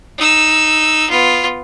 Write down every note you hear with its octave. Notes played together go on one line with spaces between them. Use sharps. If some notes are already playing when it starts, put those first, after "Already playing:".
D#4 E6
B3 F4